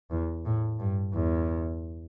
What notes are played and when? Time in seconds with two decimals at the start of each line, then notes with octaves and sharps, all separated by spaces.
0.11 E2
0.45 A2
0.79 G2
1.14 E2